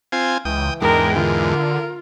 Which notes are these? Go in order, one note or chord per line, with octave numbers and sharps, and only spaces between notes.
C4 F4 G#5
C#2 E3 G5 D#6
E2 G#2 G#3 D4 A#4 G5
D3 F4 A#4